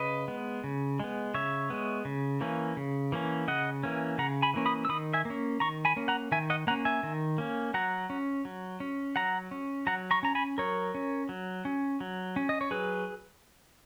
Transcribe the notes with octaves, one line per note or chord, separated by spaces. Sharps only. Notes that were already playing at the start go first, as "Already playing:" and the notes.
Already playing: C#3 B4 D#5
G#3 B3
C#3
G#3 B3
C#3 C#5 E5
G#3 B3
C#3
E3 A#3 C#4
C#3
E3 A#3 C#4
C#3 D#5 F#5
E3 A#3 C#4
C#3 F#5 A#5
G#5 B5
E3 A#3 C#4
B5 D#6
E6
D#3 B5 D#6
E5 G#5
A#3 C#4
D#3 A#5 C#6
G#5 B5
A#3 C#4
F#5 A#5
D#3 E5 G#5
D#5 F#5
A#3 C#4 F#5 A#5
E5 G#5
D#3
A#3 C#4
F#3 F#5 A#5
C#4
F#3
C#4
F#3 F#5 A#5
C#4
F#3 F#5 A#5
A#5 C#6
C#4 A#5
G#5 B5
F#3 A#4 C#5
C#4
F#3
C#4
F#3
C#4
D#5
C#5
F#3 G#4 B4